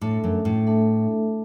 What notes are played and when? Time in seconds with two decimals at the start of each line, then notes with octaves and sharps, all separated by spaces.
0.01 A2 A3 D4 A4 E5
0.24 F#2
0.45 A2
0.67 A3 D4 A4 E5